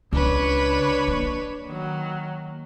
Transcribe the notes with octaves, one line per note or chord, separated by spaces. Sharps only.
C#2 D4 B4 C#5
A#3
D#3 F#3